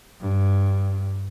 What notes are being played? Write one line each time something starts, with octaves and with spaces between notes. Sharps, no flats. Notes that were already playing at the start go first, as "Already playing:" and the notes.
G2